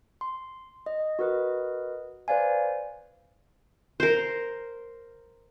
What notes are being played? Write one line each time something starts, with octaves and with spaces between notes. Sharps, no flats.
C6
D#5
F#4 A#4 B4 D#5
B4 C5 D5 F5 G#5
A#4 C5